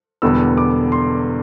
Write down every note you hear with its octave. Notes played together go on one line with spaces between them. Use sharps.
E1 E2 D3 G3 B3 E6
D6
C6